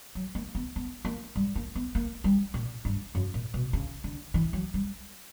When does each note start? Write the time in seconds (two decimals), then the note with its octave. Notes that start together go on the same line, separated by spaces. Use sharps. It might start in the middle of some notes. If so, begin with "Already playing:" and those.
0.15 F#3
0.35 A#3
0.55 B3
0.76 B3
1.05 A#3
1.36 G3
1.56 A#3
1.75 B3
1.95 A#3
2.24 G3
2.54 A#2
2.85 G2
3.15 F#2
3.34 A#2
3.54 B2
3.73 C#3
4.04 D3
4.34 E3
4.53 F#3
4.74 G3